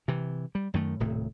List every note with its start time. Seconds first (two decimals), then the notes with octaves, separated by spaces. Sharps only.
0.08 C3 E3
0.55 G3
0.74 F#2 D#3 A3
1.00 D#1 A2 C3